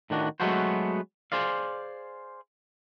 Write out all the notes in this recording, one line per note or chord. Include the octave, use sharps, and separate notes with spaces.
A2 D#3 D4 F#4
F#3 G#3 A3 B3 F#4 C5
G#4 C5 D5 F5